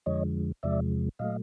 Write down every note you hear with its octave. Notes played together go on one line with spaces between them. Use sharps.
F2 D3 F3 G#3 C#5 D#5
E2 C3 F3 G#3 D5 E5
A#2 F#3 A3 D#5 F5